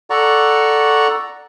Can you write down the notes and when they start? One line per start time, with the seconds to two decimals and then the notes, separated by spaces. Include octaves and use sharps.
0.10 A4 D5 F#5 A#5 C#6